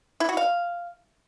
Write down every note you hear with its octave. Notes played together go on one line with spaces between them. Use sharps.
E4
F#4
F5